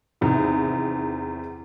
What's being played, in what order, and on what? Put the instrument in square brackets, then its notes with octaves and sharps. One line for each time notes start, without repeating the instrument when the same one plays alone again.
[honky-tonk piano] E2 C3 D#3